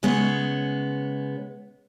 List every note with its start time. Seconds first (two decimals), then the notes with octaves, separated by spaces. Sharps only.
0.03 C#3 G#3 B3 C#5